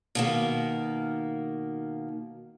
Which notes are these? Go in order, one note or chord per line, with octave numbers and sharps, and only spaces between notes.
B2 D#3 A#3